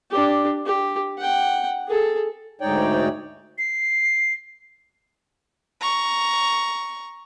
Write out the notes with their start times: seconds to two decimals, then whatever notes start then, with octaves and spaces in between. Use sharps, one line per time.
0.11 D4 G4
0.66 G4
1.18 F#5 G5
1.88 G#4 A4
2.61 D2 G#2 D#4 C#5 D5 G5
3.58 C7
5.81 A#5 C#6